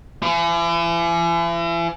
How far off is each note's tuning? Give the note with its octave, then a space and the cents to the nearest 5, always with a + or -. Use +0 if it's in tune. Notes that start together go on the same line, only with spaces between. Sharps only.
E3 +40